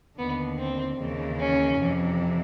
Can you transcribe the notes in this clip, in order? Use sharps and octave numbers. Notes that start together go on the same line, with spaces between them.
D#2 D3 B3
C4
D#2 C#3 E3
C#4
F2 C3 E3